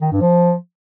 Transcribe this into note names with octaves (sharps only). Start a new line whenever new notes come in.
D#3
G2
F3